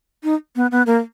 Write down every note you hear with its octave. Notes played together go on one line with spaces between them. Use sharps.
D#4
B3
B3
A#3